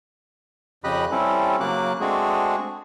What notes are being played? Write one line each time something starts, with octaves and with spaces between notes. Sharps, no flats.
F2 C#3 G4 D#5 B5 F#6
G3 C4 C#4 E4 A4
C#3 F#3 A#3 D6 F#6
G#3 A3 C4 D4 F#4 G#4